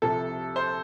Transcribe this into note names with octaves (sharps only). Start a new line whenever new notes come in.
C2 C3 F3 A4
C5